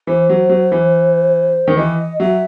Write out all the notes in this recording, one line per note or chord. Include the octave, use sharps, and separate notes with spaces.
E3 C5
F#3
F#3
E3
D#3
E3 D#5
F#3 E5